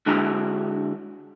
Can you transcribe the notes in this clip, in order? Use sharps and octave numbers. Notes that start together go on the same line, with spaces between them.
D3 G#3 D4 E4 F#4 A#5